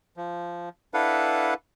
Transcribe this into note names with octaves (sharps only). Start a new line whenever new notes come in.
F3
D4 E4 A4 B4 F5 F#5